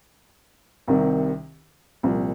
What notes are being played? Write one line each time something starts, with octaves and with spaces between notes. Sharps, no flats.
C2 C3 D#3
C2 A#2 F3